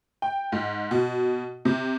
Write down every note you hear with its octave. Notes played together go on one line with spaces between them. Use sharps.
G5
G#2
B2
C3